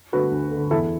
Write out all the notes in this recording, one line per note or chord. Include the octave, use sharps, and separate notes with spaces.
D3 A3 F#4 B4
D2
A3
D3
E2 E4 A4